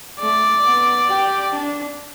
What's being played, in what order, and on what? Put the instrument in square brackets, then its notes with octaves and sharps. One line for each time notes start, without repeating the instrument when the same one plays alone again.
[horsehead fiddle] A3 [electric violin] D5
[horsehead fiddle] B3
G4
D4